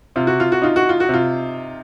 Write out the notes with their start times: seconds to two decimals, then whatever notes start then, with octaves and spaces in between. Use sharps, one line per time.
0.16 C3 F4
0.27 F#4
0.40 F4
0.52 F#4
0.62 D#4 F4
0.76 F#4
0.89 F4
1.00 F#4
1.09 C3 F4